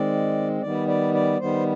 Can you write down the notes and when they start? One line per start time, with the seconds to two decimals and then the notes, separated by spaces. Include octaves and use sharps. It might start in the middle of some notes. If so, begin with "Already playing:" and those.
Already playing: D#3 G#3 C4 D5
0.62 D#3 G3 B3 D5
0.88 D5
1.14 D5
1.40 D#3 G3 B3 C5